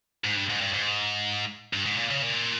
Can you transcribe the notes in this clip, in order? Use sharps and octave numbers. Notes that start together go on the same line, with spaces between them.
G#2
G2
G#2
G2
G#2
G2
G#2
A#2
C#3
A#2